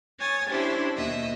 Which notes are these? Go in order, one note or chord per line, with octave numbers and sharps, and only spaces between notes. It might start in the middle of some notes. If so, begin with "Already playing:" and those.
C#5 G#5 D#6 A6
C#4 D4 E4 G4 C5
D#2 B2 D#5 E5